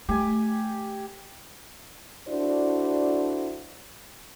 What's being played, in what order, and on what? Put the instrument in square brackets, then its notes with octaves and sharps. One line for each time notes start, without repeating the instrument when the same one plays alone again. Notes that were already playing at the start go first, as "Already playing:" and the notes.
[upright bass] A3 [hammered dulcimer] G4 G#5
[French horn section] D4 E4 F#4 A4 C5 D5